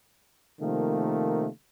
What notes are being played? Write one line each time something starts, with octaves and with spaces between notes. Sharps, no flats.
C3 D#3 F3 A3 A#3